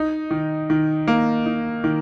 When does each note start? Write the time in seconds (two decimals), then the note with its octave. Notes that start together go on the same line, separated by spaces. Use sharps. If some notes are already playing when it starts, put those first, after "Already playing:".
Already playing: D#4
0.31 D#3
0.70 D#3
1.08 A#3
1.46 D#4
1.84 D#3